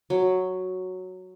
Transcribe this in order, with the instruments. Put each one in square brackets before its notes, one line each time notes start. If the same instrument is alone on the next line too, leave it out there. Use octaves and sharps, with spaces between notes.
[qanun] F#3